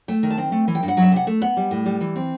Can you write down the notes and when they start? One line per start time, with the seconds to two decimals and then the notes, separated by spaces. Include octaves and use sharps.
0.08 A3 G5
0.23 D#3
0.30 A5
0.38 C4
0.52 A3
0.68 E3
0.75 G5
0.83 G2
0.88 F#5
0.97 F#3
1.02 E5
1.12 C3 F#5
1.27 A3
1.41 B3 F#5
1.57 G3
1.71 A2
1.86 G3
2.01 E3
2.16 C4